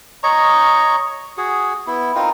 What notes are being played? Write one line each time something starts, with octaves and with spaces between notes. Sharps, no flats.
C#5 D#5 A#5 C#6
F#4 G#4
B3 E4
C4 D#4 F4 A#4